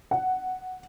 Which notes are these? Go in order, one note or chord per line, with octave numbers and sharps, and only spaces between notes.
F#5